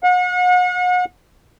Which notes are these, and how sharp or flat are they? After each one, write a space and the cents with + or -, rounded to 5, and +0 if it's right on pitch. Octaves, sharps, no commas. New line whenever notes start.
F#5 -40